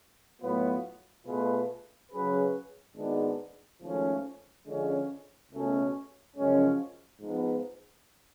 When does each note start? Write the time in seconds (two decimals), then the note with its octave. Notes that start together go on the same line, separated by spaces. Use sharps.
0.41 A2 F#3 B3 F4 B4
1.26 B2 A3 F4 G#4 B4
2.11 C#3 F#3 C#4 G#4 B4
2.96 G#1 G#2 G#3 B3 D4
3.81 G#1 G#2 F3 A3 C#4
4.66 D3 F3 G#3 C#4
5.52 C#2 B2 A3 C#4
6.36 F#2 C#3 F3 G#3 C#4
7.21 G#2 F3 B3